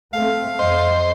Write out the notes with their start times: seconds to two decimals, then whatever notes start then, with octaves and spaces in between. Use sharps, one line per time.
0.14 A3 C4 F5
0.59 F2 C5 D#5